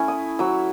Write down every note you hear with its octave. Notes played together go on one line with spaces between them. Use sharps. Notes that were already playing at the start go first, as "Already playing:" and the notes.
Already playing: A3 C#4 E4
D#6
F#3 E6